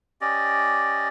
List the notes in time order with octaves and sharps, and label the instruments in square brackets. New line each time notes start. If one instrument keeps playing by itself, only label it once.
[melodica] C#4 G4 D5 D#5